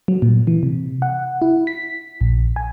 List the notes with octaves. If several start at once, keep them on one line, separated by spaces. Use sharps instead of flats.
F#3
A#2
E3
C3
F#5
E4
B6
A#1
G#5